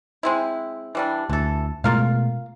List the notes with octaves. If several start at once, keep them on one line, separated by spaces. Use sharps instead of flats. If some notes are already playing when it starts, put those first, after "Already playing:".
G#3 C4 E4
E3 G3 D4
D2 E3 A4
B2 G#3 A3 F4 A#4 F5